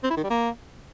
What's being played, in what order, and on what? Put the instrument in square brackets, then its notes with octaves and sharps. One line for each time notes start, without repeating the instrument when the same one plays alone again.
[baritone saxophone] C4
E4
D#3
G3
A#3